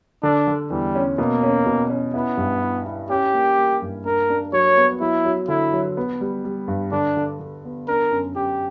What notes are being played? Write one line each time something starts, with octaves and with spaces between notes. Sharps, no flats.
D3 D4
D3
E2 G3
C#4
B2 A#3
C#4
B2
C#4
B3 E4
G2
E4
E4
C#4 G4
A#3
A#3
G2
D4 A#4
D4
F#3 C#5
B3
F#3 E4
F#3
D3 E4
F#3
B3
G3
G3
G2
D3 D4
D3
D3
B3
D4 A#4
F#2
F#2 G4